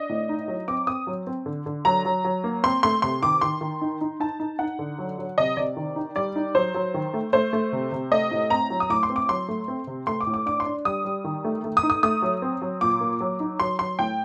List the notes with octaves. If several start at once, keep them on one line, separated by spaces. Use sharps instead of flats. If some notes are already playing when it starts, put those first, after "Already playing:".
Already playing: D4 D#5
A2
D#4
F#3
C4 D6
C4 D#6
F#3
C4
D3
D3
F#3 A#5
F#3
F#3
A#3
C4 C6
A3 C6
C3 C6
D#3 D6
D#3 C6
D#3
D#4
D#4
D#4 A5
D#4
D#4 F#5
D3
F#3
F#3
C3 D#5
C3 D5
D#3
D#4
G3 D5
D#4
F#3 C5
F#3
D#3
A3
A3 C5
A3
C3
C3
A3 D#5
A2
C4 A#5
F#3
D#6
A2 D6
C6
C4
D6
F#3 C6
A3
C4
C3
A3 C6
D6
A2
D6
D4 D6
C6
D4
G3 D#6
G3
D#3
A3
A3
D#6
D#4
D#6
A3 D#6
F#3
C4
F#3
A#2 D6
A#3
F#3
D#4
F#3 C6
F#3 C6
A2 G5